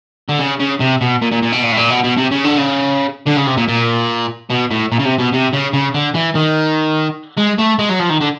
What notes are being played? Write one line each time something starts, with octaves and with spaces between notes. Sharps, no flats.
D3
C#3
C#3
C3
B2
A#2
A#2
A#2
B2
A#2
A2
A#2
B2
B2
C3
C#3
D3
C#3
D3
C#3
C3
A#2
A#2
B2
A2
A#2
C#3
C3
B2
C3
C#3
C#3
D3
E3
D#3
G#3
A3
G#3
F#3
F3
D#3
D3